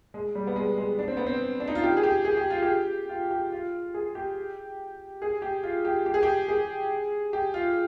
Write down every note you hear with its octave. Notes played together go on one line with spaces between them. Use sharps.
G#3
G3
B3
G#3
G#3
D4
C4
B3
C4
D4
D#4
F4
G4
G#4
G4
G#4
G4
F4
G4
F4
G4
F4
G#4
G4
G#4
G4
F4
G4
G4
G#4
G4
G#4
G4
F4